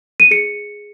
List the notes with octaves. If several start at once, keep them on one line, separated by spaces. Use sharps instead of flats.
D#7
G#4 C#7